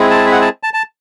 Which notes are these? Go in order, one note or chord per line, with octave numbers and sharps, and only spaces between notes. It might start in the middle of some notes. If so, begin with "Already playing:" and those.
Already playing: G#3 C4 E4 G#4
A5
E5
F#5
A5
A5
A5